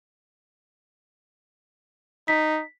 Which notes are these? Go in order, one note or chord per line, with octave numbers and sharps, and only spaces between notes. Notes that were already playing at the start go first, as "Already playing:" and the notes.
D#4 B6